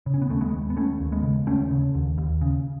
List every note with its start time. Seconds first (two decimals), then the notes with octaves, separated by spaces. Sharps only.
0.06 C#3
0.14 C#4
0.22 B3
0.30 D#2 A3 C#4
0.41 G#3 B3
0.52 D#2
0.70 B3
0.77 D#2 A3 C#4
1.00 D#2
1.12 G#3 B3
1.23 C#3
1.47 D#2 A3 C#4
1.71 C#3
1.95 D#2
2.18 D#2
2.41 C#3